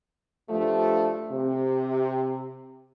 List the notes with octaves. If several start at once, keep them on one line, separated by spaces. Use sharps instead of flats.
G2 F3 A3
C3